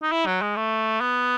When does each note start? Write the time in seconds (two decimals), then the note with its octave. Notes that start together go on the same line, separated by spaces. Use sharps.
0.03 D#4
0.12 E4
0.26 F#3
0.41 G#3
0.56 A3
1.00 B3